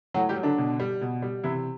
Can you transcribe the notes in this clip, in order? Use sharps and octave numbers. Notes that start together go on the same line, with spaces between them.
A2 F#3 F#4
G3 G4
F#3
D3 D4
B2
G3
B2
G3
C3 E3 E4